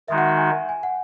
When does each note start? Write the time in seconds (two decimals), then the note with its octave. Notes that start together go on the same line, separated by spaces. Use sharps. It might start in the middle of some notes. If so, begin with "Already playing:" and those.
0.08 D#3 G#3 D#4 F#4 E5
0.18 F#5
0.28 F#5
0.38 G#5
0.69 G#5
0.83 F#5